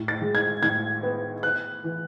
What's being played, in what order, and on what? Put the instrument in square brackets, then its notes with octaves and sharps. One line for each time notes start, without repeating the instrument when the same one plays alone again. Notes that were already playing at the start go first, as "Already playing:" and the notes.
Already playing: [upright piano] A2
A6
G#3
G#6
A2 G#6
B3
B3 F#6
E3